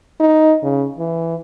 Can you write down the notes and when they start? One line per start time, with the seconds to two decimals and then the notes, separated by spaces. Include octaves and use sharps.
0.20 D#4
0.63 C#3
0.98 E3